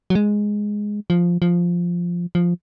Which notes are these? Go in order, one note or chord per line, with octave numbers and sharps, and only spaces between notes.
F#3
G#3
F3
F3
F3